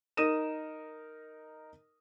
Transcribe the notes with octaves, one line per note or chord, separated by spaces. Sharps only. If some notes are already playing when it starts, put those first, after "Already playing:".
D#4 A#4 D#6 A#6 D#7 E7